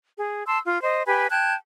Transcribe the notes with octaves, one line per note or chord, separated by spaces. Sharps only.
G#4
A5 C6 E6
F4
C5 D#5
G4 B4 G#5 B5
G5 A5 F#6 G#6